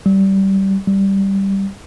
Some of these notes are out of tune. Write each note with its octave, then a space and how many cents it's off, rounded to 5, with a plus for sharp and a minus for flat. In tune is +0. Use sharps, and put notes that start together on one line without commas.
G3 -20
G3 -5